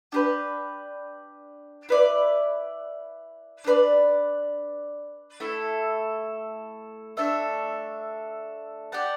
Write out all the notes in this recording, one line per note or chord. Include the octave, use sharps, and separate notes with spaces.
D4 G4 B4
E4 B4 D5
D4 G4 B4 D5
A3 E4 A4
A3 D4 A4 E5
G4 D5 F#5 A5